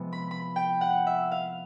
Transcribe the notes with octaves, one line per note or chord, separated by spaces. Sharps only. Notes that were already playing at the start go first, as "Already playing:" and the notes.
Already playing: C3 F3 G#3 B3
B5
B5
G5
F#5
E5
F5